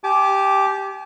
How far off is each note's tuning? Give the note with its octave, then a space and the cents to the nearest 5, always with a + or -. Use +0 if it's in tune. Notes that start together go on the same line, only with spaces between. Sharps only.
G4 +0 G#5 +45 D6 -5